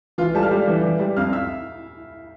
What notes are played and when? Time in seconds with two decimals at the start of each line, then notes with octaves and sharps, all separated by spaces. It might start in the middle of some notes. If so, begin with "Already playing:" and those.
0.18 E3 F4 F5
0.35 G3 A4 A5
0.43 F5 F6
0.51 G3
0.68 E3
0.83 E3
1.00 G3
1.16 F2 F5 F6
1.33 E5 E6